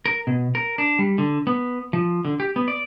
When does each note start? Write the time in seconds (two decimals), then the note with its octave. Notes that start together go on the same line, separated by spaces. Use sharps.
0.06 A#4
0.27 B2
0.55 A#4
0.78 D4
0.99 G3
1.18 D3
1.47 B3
1.93 F3
2.25 D3
2.40 G4
2.56 B3
2.68 D5